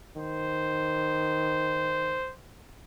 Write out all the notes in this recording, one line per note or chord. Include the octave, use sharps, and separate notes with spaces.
D#3 C5